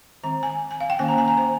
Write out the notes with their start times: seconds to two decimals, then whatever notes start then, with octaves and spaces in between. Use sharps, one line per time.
0.24 D#3 G#3 C4 A#5
0.43 G#5
0.71 G#5
0.81 F5
0.90 G5
0.99 D#3 A#3 C#4 G#5
1.08 A#5
1.18 G#5
1.28 A#5
1.37 C5